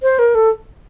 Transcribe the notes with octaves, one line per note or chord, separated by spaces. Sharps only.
C5
A#4
A4